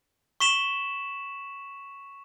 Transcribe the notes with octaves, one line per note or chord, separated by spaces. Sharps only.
C#6 B6 E7 F#7